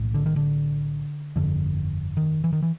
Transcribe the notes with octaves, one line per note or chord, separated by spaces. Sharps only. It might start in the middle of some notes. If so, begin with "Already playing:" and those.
Already playing: B1 A2
D3
D#3
D3
G1 F2 D3
D#3
E3
D#3
E3